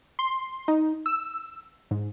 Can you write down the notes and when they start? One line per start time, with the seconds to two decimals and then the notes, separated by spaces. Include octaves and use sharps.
0.19 C6
0.68 D#4
1.06 E6
1.91 G#2